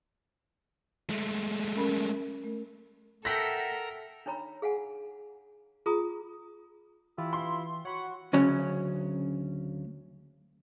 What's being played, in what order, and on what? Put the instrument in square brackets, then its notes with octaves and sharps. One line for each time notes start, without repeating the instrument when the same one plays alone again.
[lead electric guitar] G#3 A3
[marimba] C#4 A#4 B5
A3 A#4
[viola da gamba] A4 [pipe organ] A#4 A#5 [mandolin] E5 F#5 G5 [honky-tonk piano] A#6 B6
[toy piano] D4 D#4 C#5 A#5 B5
G#4 F5 F#5 G#5
F4 G#4 A#5 D#6
[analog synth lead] E3 [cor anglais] E4 [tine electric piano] F4 G4
[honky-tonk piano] C6
[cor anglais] F#4 [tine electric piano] C#5 B5 [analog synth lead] F#5
[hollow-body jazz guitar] D2 C#3 F#3 C#4